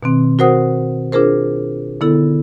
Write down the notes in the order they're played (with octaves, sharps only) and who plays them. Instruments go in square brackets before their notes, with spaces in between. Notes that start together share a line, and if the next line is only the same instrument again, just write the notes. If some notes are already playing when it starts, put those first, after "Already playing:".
[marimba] B2 D#3 C4
F#4 A#4 C5 F#5 D#6
D4 F4 G#4 A#4 C5
D3 B3 E4 A4